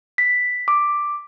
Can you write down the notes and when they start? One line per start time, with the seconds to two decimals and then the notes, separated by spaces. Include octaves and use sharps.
0.18 B6
0.68 D6